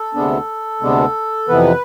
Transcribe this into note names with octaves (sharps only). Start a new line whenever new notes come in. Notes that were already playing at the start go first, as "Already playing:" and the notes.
Already playing: A4
D2 C3 G#3 B3 D4
D2 C3 G#3 B3 D4
F2 C3 E3 B3 B4